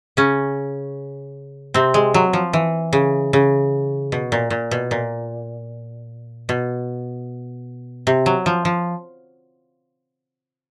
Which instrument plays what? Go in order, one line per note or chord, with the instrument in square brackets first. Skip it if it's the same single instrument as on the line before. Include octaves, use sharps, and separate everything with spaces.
[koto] C#3 C#4
C3 C4
G#3
F#3
F3
E3
C#3
C#3
B2
A#2
A#2
B2
A#2
B2
C3
F#3
F3
F3